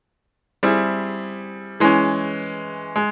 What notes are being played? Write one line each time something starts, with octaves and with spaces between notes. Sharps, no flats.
G3 C4 E4 G#4
E3 G#3 C#4
G#3